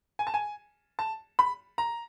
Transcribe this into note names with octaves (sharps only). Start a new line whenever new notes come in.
G#5
A5
G#5
A5
B5
A#5